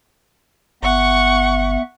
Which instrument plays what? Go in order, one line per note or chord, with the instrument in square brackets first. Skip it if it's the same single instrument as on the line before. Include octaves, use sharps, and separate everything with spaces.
[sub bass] G1 [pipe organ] B3 E5 [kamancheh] F#5 C#6